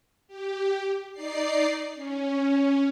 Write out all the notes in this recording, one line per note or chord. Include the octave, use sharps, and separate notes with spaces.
G4
D#4 D5 C7
C#4